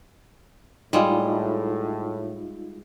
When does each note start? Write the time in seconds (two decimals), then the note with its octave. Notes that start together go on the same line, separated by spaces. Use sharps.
0.93 A2 G3 G#3 D#4 F4